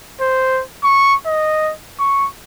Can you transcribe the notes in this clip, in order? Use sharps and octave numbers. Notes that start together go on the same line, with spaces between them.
C5
C#6
D#5
C#6